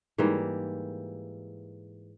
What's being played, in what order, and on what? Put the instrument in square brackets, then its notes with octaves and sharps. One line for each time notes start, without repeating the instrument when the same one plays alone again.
[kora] G#2 E3 G3 A#3